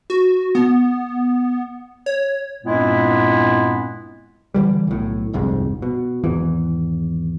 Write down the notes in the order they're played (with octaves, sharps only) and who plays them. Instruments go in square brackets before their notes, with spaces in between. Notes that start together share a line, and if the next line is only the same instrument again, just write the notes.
[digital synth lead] F#4
B3
C#5
[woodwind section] G2 A#2 G#3 B3 C4 E4
[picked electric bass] D3 E3 G3
B1 A2
G1 C2 F2 G#2
B2
G#1 E2 E3